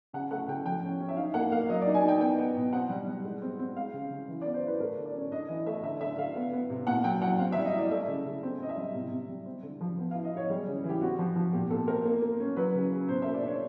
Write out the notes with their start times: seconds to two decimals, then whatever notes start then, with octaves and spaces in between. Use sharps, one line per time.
0.13 C#3 F#5
0.31 A3 F#5
0.48 C#3 G5
0.65 F3 G5
0.83 C#4
1.00 C#4
1.09 E5
1.17 D#4 F5
1.34 A#3 F#5
1.52 A#3 F5
1.69 F#3 D#5
1.82 D5
1.87 D#4
1.94 G#5
2.03 D#4 G5
2.21 B3 G5
2.38 B3
2.56 B2
2.73 C4 F#5
2.90 G3
3.08 G3
3.24 G#3
3.42 C4
3.59 C4
3.76 G#3 F5
3.93 C#3
4.10 C#3
4.28 E3
4.42 D5
4.46 B3
4.54 C5
4.63 E4 B4
4.80 A3 A#4
4.97 D3
5.05 D5
5.15 C#4
5.32 D4 D#5
5.48 E3 D#5
5.66 A3 E5
5.83 D3 E5
6.01 D3 E5
6.17 D3 F5
6.36 B3
6.53 B3
6.70 C3
6.87 A#2 F#5
7.04 F#3 G5
7.22 F#3 F#5
7.39 C4 F5
7.52 G3 E5
7.65 D#5
7.74 E4 D5
7.91 A3 E5
8.08 C#3
8.26 C#3
8.43 C4
8.60 C4 D#5
8.69 E5
8.77 G3
8.95 C3
9.11 C3
9.29 G3
9.46 C4
9.63 D3
9.81 F3
9.98 B3
10.11 E4 F5
10.24 D#5
10.32 E4 C#5
10.50 G3 G#4
10.67 C#3
10.84 E3
10.89 G4
11.01 C4 F#4
11.19 F3
11.36 F3
11.53 A#2 G4
11.70 A#2 A4
11.87 C4 A#4
12.05 A#3
12.22 A#3
12.40 C#4
12.56 F#3 B4
12.75 C#3
12.92 C#3
13.08 B2 C5
13.22 A#3 E5
13.34 D5
13.43 D4 C#5